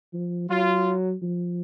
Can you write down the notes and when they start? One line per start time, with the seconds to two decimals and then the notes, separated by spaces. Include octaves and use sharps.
0.14 F3
0.49 F#3 F4
1.22 F3